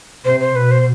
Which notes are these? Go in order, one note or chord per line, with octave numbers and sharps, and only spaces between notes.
C3 C5
C5
B2 B4
C5